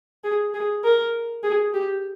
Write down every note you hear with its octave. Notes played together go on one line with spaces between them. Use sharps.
G#4
G#4
A#4
G#4
G4